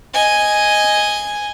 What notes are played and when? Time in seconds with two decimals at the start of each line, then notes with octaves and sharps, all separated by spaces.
0.14 D#5 G#5